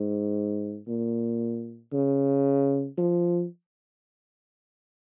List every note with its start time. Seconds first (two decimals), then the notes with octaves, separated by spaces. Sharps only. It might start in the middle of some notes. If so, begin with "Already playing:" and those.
Already playing: G#2
0.88 A#2
1.93 C#3
2.98 F3